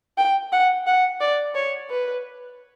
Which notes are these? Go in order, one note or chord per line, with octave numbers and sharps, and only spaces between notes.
G5
F#5
F#5
D5
C#5
B4